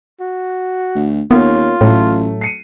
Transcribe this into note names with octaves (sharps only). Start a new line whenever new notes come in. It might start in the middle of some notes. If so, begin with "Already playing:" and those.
F#4
D2
D#2 A#3 B3 C#4 F4
A1 A2 F#3 A3
C7 C#7 D#7